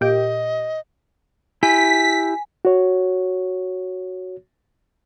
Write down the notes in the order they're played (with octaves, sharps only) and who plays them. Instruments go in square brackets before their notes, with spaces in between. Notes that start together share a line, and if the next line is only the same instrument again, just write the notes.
[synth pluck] A#2 G4 [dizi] D#5
[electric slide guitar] E4 G4 [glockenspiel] G#5 [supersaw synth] B6
[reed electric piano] F#4 C#5